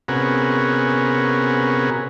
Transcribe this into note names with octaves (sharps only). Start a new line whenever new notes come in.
C3 B3 C#4 F#4 G#4 A#4